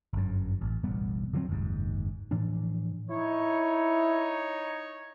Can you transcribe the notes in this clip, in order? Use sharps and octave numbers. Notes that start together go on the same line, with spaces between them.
G1 F#2
A1
E1 A1 G3 B3
D3 F3 F#3 C4
F#1 D#2 G#2
A2 E3 F3 D4
D#4 E4 C#5